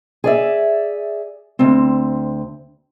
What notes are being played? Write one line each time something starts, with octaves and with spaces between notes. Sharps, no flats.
G#4 D5 E5
D2 C4